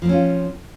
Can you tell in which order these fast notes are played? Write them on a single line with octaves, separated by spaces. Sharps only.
F3 C4 C#4 F4